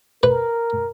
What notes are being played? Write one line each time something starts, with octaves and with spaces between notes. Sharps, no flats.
A#4 B4